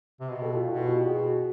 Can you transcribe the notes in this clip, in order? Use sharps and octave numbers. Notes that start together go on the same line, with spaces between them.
C3
B2
G4 A4
F4
B2 E4 F#4
F4 G4
B2 F#4 G#4